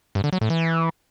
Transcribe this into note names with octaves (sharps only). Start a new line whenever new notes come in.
G2
D3
F#3
A2
E3